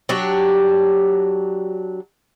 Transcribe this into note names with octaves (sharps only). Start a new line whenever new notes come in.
F#3 D4 G4